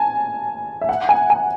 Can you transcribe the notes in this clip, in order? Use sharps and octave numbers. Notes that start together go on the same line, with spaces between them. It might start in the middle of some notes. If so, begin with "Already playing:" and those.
Already playing: G#5 A5
E5
F#5
G#5
G#5